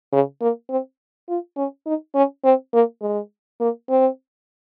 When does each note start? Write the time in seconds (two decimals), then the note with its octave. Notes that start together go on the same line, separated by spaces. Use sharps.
0.12 C#3
0.41 A#3
0.70 C4
1.29 F4
1.57 C#4
1.86 D#4
2.15 C#4
2.44 C4
2.73 A#3
3.02 G#3
3.60 A#3
3.89 C4